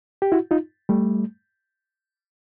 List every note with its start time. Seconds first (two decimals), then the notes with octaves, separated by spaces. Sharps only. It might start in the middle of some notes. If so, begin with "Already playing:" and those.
0.22 G4
0.32 E4 F#4
0.51 D#4 F4
0.89 G3 A3